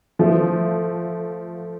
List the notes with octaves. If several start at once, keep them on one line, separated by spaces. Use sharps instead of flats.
F3 A3